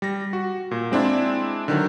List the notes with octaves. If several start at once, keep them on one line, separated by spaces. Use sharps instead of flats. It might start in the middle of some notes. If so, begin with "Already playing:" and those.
G3 A#6
F#4
A#2
G#3 C4 D4 E4
D3 D#3 F#3